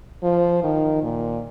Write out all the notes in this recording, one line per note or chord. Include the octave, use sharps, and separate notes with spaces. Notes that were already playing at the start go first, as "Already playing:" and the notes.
F3
D#3
A#2